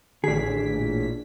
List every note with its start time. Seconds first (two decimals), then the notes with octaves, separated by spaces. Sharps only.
0.24 A1 D3 D4 G#4 B6
0.74 A#2